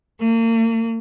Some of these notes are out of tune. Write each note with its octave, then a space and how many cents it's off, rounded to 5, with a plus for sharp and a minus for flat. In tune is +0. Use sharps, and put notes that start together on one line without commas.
A#3 -40